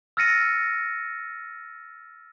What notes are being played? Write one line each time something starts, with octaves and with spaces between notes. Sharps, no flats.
E6 F6 A6 A#6 C#7 D#7